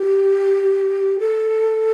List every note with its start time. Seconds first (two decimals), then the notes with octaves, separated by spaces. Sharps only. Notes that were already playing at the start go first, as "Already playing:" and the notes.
Already playing: G4
1.19 A4